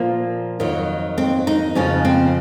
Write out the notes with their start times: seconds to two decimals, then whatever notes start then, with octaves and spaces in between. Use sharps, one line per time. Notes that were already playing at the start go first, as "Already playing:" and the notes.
Already playing: A#2 F3 A#3
0.60 F2 D#3 F#3
1.18 C4
1.47 D#4
1.75 F2 C#3 F3 C#4
2.05 C4